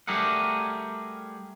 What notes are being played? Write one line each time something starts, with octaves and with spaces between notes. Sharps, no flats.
G3 A3 G4 G#4 A#4 F#5